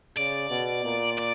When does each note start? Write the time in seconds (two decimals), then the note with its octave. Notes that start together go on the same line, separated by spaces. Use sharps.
0.17 C#3 D5
0.50 B2
0.85 A#2
1.19 D5